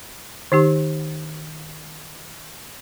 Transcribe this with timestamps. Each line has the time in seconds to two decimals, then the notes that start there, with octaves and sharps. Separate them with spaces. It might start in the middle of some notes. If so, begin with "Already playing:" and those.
0.52 D#3 D#4 G4